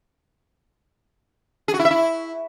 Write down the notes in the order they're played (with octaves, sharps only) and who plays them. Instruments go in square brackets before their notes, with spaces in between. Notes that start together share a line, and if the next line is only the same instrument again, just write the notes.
[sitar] G#4
F#4
E4
E5
E4